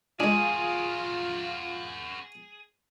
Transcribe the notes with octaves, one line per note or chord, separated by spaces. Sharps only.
G#3 D4 F4 F#4 G#4 A#4